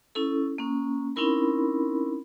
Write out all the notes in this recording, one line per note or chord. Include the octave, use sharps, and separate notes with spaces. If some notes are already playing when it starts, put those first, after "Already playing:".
C#4 E4 A4
A#3 C#4
C4 C#4 D#4 E4 A#4 B5